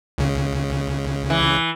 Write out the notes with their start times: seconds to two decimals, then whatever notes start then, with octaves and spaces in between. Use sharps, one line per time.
0.18 C#2 C#3
1.30 E3